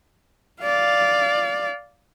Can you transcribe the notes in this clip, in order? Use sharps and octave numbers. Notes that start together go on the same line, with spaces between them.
D5 F5